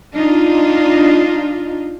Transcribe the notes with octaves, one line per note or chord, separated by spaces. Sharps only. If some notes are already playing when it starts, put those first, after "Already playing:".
D4 D#4 F4